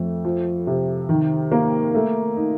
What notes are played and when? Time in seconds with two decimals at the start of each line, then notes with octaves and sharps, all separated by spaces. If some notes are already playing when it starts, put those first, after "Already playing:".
Already playing: F2 A3
0.25 F3
0.67 C3
1.09 D#3
1.52 A#3
1.95 A3
2.37 D#4